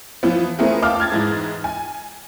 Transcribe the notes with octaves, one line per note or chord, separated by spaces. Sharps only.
E3 F3 B3
A3 B3 C4 E4 G#4 A#4
F5 G5 A5 D6 F6
F6 G#6 A6
G#2 E3 G#3
G#5